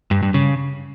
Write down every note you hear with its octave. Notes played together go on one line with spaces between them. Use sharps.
G2
G2
C#3